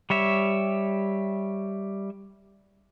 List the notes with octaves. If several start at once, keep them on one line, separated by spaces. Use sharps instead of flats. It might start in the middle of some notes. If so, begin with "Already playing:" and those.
G3 C#5 E5